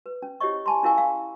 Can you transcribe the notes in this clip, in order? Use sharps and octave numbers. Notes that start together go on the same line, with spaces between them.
B4
C#4
E4 G4 C5 C#5 D#5 C#6
G#5 A5 B5 C6
C#4 E4 A#4 F5 G#5 C#6
F5